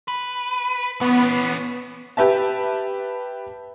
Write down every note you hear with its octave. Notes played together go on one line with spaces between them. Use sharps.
B4
E3 B3 C#4
G4 B4 E5 A5